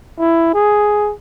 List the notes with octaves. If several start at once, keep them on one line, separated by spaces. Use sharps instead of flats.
E4
G#4